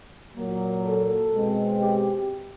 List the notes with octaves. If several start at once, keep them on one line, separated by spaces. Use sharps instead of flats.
A#2 F#3 A#3
A4
B2 G#3 C4
G4